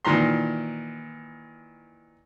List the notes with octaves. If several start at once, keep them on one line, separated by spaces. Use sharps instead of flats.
A#2 D#3 E3 A#5 C6